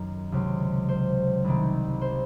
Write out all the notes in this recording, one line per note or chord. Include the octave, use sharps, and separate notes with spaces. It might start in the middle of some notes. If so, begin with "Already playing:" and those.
Already playing: F#2 D#3
C#2 C3 F#3
C5
C2 C3 D#3
C5